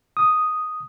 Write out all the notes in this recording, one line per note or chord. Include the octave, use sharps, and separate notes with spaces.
D#6